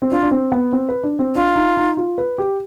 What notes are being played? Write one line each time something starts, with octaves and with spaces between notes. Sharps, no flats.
C4
D4 F4
D4
C4
B3
C4
B4
D4
C4
D4 F4
D#4
D#4
F4
B4
G4